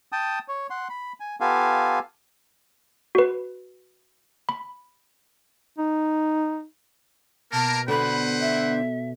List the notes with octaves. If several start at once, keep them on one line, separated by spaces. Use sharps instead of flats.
G5 A5 D#6
C#5
F#5 C6
B5
G#5
B3 F4 G4 A4 F5 G#5
F#4 B4
B5
D#4
B2 A#3 A#4 A5
D3 B4 C5 F#5 B5
E5